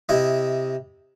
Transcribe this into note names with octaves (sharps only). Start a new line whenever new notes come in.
C3 E4 D#5